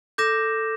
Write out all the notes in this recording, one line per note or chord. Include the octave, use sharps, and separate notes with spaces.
A4 D6 G6 A#6 E7